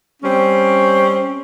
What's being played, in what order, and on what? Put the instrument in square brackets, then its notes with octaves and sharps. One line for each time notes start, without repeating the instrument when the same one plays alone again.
[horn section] G3 C4 C#4